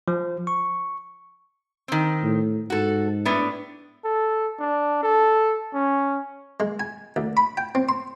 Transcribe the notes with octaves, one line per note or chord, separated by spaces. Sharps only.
F3
C#6
D#3 C4
A2
G#2 F#4 A4
A2 B3 D4
A4
D4
A4
C#4
G#3
G#5
D2
B5
G5
C4
C6